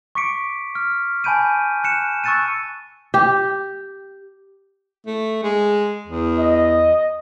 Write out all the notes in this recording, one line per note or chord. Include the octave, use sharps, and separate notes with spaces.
C#6 D6 B6 C#7 D7
F6
G#5 A5 B5 G6 D7 D#7
F#6 C#7 E7
C#6 E6 F#6 A6 C#7 D#7
G4
A3
G#3
E2
D#5